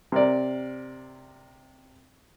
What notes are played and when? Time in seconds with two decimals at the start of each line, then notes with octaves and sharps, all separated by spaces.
0.12 C3 A#4 D5